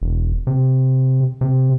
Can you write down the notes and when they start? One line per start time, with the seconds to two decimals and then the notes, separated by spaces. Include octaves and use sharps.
0.02 E1
0.47 C3
1.41 C3